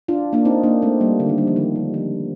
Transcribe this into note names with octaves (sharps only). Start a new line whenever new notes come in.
D4 F4
A#3 D4
C4 D#4
A#3 D4
A3 C4
G3 A#3
D3
D#3
G3
F3
D#3
D#3
F3